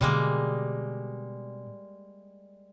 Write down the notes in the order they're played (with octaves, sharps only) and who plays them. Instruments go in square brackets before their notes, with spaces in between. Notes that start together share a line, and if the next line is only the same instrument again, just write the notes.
[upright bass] B2 D3 [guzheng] G3 G#3 A#3